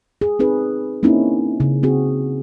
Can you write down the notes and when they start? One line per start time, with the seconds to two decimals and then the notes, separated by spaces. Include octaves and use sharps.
0.21 G#4
0.39 C4 D#4 G#4 B4
1.03 A#3 C4 C#4 D#4 E4
1.60 C#3
1.83 C4 F#4 G#4